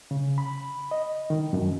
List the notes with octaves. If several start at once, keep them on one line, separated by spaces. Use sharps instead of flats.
C#3
B5
D#5
D#3
F#2